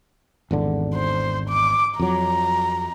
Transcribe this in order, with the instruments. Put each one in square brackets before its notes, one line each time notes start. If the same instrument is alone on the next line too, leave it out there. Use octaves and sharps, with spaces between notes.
[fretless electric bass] G#1 E2 D3
[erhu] C5
D6
[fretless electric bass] F2 F#3 [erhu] A#5